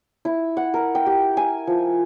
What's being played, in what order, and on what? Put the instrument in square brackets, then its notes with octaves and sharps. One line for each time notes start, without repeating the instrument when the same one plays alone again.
[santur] E4
F#5
A#4
G5
G4
G#5
F3